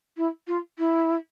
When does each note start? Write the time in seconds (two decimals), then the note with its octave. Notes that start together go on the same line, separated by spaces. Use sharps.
0.17 E4
0.47 F4
0.78 E4